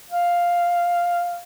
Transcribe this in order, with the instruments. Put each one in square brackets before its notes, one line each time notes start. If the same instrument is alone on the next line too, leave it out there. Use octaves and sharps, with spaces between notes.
[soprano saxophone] F5